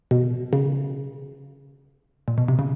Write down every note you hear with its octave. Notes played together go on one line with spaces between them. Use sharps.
B2
C#3
A#2
B2
C3
C#3